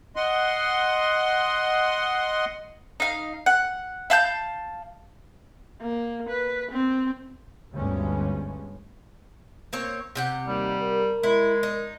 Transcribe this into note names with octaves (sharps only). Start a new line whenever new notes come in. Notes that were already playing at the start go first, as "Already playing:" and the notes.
D#5 F#5 C6
D#4 F5
F#5
E5 F5 A5 G6
A#3
B4
C4
G1 D2 G2 G3 G#3 C#4
A#3 C4 C#5
C3 G4 F#5
D#2 G3
A#4
G#3 E4
D#4